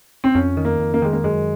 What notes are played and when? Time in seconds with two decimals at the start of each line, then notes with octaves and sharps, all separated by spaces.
0.24 C4
0.35 F2 C#4
0.57 D#3
0.65 A#3
0.79 F2
0.94 A#3
1.02 D#3 G#3
1.13 A#3
1.24 F#2 G#3